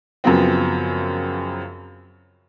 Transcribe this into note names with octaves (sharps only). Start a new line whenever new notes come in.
F#2 C#3 F3 F#3 B3 C4